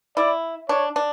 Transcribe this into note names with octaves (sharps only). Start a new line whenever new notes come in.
E4 D5
D4 C#5
D4